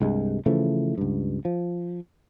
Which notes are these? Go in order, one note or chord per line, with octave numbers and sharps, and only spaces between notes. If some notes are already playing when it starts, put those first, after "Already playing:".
C2 G2 G#3
C#3 E3 F3 A3
C#2 G2
F3